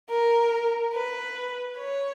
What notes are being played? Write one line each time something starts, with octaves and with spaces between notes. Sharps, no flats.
A#4
B4
C#5